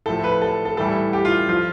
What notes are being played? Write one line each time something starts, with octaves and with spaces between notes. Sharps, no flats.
A2 F3 A4
B4
A4
A4
A2 E3 G3 A4
G4
F4
F3 F4